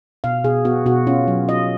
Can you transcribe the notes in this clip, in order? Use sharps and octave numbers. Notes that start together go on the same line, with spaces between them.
B2 F5
B2 G#4
B3 F#4
B2 F#4
C#4 F4
F#3
F4 D#5